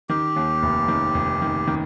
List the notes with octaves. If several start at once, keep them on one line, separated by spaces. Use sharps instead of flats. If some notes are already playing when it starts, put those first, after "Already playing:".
D#3 G4
D#2
F1
D#3
F1
D#3
D#3